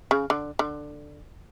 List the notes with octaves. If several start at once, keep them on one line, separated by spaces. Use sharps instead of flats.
C#3
D3
D3